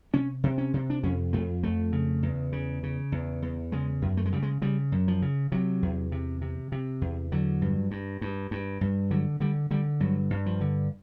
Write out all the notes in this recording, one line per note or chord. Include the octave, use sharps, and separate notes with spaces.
C3 C#4
C3
C#4
C3
D4
F2 C#4
F2 A3
F2 A3
C#3
E2
C#3
C#3
E2
E2
C#3 G#3
F#2
A3
G#3
C#3 G3
G#3
C#3 G3
F#2
F3
C#3
C3 F#3
E2
C3
C3
C3
E2
D3 F#3
G2
G2
G2
G2
G2
D3 F#3
D3 G3
D3 G3
G2 F#3
G2
F3
D3